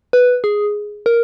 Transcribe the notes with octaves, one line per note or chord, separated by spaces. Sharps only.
B4
G#4
A#4